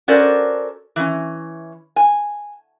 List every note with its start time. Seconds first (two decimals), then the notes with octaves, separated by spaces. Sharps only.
0.08 C#4 F#4 A4 A#4 C5 D5
0.96 E3 C#4
1.96 G#5